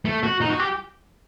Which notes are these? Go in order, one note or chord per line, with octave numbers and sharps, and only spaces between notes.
A3
F#4
D#4
F#4
G4